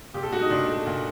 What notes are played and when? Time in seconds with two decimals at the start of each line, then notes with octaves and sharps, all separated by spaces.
0.14 A#2 G4
0.23 A4
0.32 A3 F#4
0.41 D#4
0.50 A#2 D4
0.68 A3
0.86 A#2